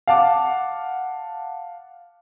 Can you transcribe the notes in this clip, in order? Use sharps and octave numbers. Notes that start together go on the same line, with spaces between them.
F5 F#5 A5 D6